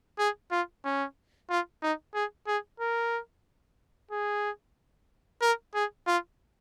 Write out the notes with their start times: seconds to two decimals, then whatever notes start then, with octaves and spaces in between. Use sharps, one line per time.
0.19 G#4
0.51 F4
0.85 C#4
1.50 F4
1.82 D#4
2.15 G#4
2.47 G#4
2.80 A#4
4.11 G#4
5.42 A#4
5.75 G#4
6.07 F4